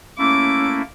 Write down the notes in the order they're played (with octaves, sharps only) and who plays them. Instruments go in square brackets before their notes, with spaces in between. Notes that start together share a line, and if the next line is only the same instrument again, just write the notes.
[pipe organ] A3 A#3 E4 [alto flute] C#4 [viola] D6